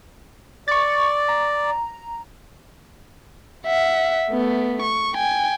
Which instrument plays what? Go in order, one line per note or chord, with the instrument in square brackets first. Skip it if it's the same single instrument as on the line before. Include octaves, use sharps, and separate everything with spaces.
[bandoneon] D5 [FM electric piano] C#6 A6
[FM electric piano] A#5
[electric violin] E5 F#5
A3 B3
C#6
G5 G#5